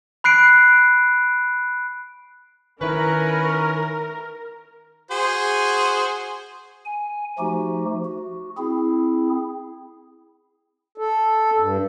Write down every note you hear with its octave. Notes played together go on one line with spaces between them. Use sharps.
B5 F#6 C7 D7
D#3 C#4 E4 A#4 B4
F#4 G#4 C5
G#5
F3 A3 D#4 F#4 G4
F#4
C4 E4 G#4
A4
G2